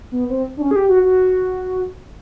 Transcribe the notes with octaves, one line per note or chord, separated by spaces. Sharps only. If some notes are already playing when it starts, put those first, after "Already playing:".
B3
C4
D4
C#4
G#4
G4
F#4
F#4